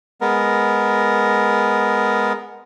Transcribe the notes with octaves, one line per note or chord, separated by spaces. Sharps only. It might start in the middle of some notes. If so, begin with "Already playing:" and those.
G#3 B3 A#4